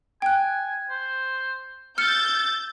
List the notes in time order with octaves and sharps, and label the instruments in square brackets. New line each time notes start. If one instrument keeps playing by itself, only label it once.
[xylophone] G5 F#6 [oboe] G#5
[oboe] C5
[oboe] E6 [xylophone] F6 C#7 [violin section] G6 A6